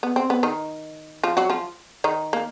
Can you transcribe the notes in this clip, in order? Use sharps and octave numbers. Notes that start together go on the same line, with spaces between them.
B3
C4
B3
D#3 D#4
F3 F4
F#3 F#4
F3 F4
D#3 D#4
A#3